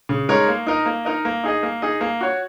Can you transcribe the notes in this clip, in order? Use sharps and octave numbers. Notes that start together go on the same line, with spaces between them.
C#3
G#3 D#4 A#4 C#5
A#3
D#4 A#4 D#5
A#3
D#4 A#4 D#5
A#3
D#4 G#4 D#5
A#3
D#4 G#4 D#5
A#3
F#4 C#5